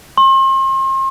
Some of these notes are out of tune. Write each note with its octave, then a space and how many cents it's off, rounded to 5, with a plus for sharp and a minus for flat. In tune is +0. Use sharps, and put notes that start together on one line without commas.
C6 +40